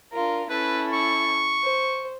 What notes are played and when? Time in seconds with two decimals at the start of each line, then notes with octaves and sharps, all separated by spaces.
0.12 D4 F4 A#4
0.50 C#4 E4 A4 B4
0.93 C#6
1.63 C5